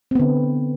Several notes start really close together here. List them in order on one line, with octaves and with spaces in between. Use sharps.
C4 B3 D3